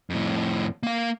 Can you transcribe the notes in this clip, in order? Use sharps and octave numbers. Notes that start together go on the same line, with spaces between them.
F2 A2
A#3 F5